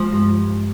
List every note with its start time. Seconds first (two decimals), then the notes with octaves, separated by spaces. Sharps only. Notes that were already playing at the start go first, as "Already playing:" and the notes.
Already playing: F3 G#3
0.13 G2